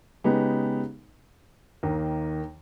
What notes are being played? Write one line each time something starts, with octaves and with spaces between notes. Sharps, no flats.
C#3 G#3 B3 D#4 G4
D#2 D#3 A#3